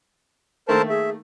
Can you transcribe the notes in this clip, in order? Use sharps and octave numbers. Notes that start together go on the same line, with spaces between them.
D#3 A3 A#3 A4 A#4 C5 A5
G#4 E5